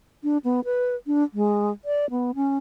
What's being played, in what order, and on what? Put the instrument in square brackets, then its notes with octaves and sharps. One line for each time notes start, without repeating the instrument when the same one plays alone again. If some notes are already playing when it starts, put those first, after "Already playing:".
[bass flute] D4
B3
B4
D4
G#3
D5
B3
C#4